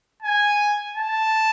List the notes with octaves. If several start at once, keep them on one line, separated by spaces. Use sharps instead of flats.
G#5
A5